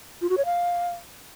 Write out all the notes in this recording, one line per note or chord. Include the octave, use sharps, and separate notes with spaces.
F4
F#4
C#5
F5